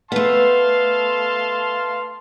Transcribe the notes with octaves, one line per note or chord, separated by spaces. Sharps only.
A3 B3 F5 A5 C6